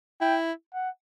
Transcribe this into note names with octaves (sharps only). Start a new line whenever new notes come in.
E4 G5
F#5